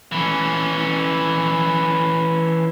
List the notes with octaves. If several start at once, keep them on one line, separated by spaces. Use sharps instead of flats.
E3 C#4